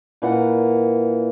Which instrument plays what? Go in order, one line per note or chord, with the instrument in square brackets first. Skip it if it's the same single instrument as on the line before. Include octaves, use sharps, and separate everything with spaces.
[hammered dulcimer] A#2 E3 F#5